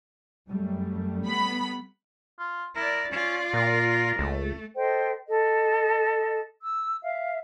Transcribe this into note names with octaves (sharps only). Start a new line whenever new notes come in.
F#2 G3 A3
B3 B5
F4
E4 A#4 D5
C#4 F4 D5
A#2 A#4
C#2 A3
A4 C5 D#5 G5
A4 D#5
E6
E5 F5